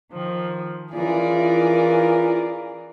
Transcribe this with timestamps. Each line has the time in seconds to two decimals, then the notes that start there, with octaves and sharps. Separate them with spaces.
0.12 D#3 F3
0.93 E3 C#4 E4 F4 G#4 A#4 D5